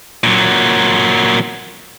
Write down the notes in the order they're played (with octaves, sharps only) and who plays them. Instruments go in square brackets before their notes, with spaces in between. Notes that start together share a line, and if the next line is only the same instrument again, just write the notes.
[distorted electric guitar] A#2 F#3